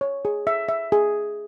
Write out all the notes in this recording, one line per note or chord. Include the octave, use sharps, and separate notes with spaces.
C#5
G#4
E5
E5
G#4